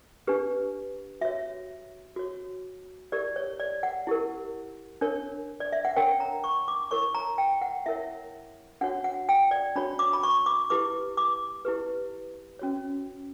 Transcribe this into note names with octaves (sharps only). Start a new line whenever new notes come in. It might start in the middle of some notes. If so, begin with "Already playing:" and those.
D4 G4 B4
F#4 C#5 E5
F#4 C#5
E4 G4 A#4 D5
C#5
D5
F#5
E4 G4 A#4
D4 A#4 C#5
D5
E5
F#5
D4 A#4 C#5 G5
A#5
C#6
D6
E4 A#4 C#5 C#6
A#5
G5
F#5
E4 A#4 C#5 E5
D4 F#4 C#5 F#5
F#5
G5
D5
D4 F#4 C#5 B5
D6
B5
C#6
D6
E4 G4 B4 D6
D6
E4 G4 B4
C#4 F#4 C#5